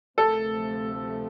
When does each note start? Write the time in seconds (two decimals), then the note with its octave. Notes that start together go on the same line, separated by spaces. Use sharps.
0.18 D2 C3 F3 A3 C4 A4